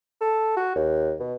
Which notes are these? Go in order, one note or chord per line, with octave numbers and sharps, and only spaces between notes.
A4
F#4
D#2
B2